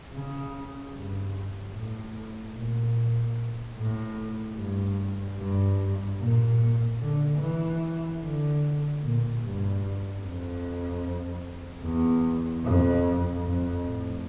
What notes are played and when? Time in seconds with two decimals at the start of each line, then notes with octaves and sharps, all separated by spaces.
0.13 C#3
0.94 G2
1.74 A2
2.55 A#2
3.76 A2
4.57 G2
5.38 G2
6.19 A#2
6.99 D3
7.39 E3
8.20 D3
9.02 A#2
9.41 G2
10.22 F2
11.83 E2
12.65 F2
13.45 F2
13.86 A2